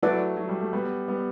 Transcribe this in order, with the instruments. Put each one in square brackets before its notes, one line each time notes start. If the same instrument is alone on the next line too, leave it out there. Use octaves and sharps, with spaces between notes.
[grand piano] F#3 A3 [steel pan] E4 B4 D5 F#5
[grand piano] F#3
G3
A3
G3 B3
G3 B3